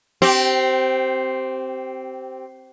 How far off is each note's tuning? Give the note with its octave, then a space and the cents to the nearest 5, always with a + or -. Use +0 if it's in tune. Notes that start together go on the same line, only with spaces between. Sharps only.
C4 +0 G4 -25